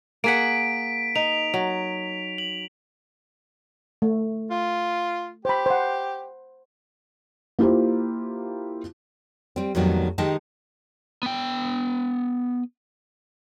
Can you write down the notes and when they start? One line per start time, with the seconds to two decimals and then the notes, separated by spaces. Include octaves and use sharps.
0.24 A#3 G#4 F#5 B6 D7
1.16 D#4 F7
1.54 F#3
2.38 F#7
4.02 A3
4.50 F4
5.45 G4 C5 B5
5.66 C5 F#5
7.59 A#3 E4 F4 G4 C5
9.56 G3 C4
9.75 F2 A2 D#3 F#3 G3 B3
10.18 D#3 G#3 D#4 G4 G#4 A5
11.23 B3 G5